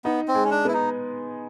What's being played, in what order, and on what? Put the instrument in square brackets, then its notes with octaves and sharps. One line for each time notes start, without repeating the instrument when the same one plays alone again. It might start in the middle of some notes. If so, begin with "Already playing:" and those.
[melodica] B3 [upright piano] D#4
[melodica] C4
[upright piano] G#3
[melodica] C#4
D4
[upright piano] B3 [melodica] E4
[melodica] D#4